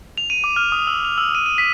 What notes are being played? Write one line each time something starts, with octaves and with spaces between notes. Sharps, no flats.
F7
D#7
D6
F6
D#6
E6
F7
E6
D#7
D#7
B6